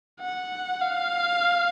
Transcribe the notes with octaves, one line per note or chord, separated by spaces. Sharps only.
F#5
F5